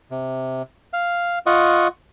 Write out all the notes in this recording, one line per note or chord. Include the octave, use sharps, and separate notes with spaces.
C3
F5
F4 D#5 F#5 C#6